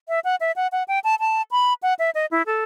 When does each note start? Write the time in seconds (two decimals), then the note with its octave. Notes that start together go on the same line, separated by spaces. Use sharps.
0.08 E5
0.24 F#5
0.40 E5
0.56 F#5
0.72 F#5
0.88 G5
1.04 A5
1.20 A5
1.51 B5
1.83 F#5
1.99 E5
2.15 D#5
2.31 E4
2.46 A4